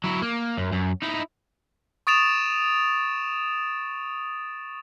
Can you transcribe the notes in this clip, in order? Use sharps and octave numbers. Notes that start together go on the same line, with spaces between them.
F#3 E4
A#3
F#2
F#2
D#4 E4
C#6 D#6 A6 D7 E7 F7